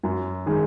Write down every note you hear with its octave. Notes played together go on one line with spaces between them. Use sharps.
F#2
D#3 G#3 D#4 G#4